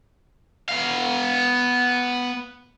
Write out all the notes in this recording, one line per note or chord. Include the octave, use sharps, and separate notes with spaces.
B3 F5